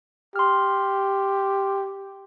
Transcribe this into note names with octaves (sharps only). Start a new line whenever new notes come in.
G4 C6 F6